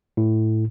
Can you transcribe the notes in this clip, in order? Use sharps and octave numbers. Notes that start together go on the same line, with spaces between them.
A2